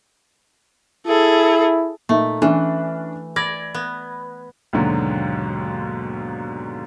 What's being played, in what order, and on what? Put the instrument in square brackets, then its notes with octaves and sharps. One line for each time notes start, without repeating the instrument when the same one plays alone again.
[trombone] E4 [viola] G#4 A4
[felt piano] A#2 D#4 E5 [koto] A3
[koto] E3 [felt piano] C#4 D4
[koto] D5 [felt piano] B5 G#6 A#6
[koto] B3
[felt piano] D#2 G#2 B2 D3 F#3